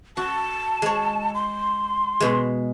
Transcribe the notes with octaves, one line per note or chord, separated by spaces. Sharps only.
F#4 A5
G#3 C#5
C6
B2 G#3